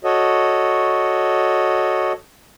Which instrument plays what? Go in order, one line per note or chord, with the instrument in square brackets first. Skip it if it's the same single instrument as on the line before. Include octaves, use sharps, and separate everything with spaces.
[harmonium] F#4 A4 C#5 D#5